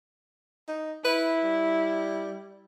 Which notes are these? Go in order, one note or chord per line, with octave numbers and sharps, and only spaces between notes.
D#4
E4 B4
G3